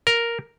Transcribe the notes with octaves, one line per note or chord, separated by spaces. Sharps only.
A#4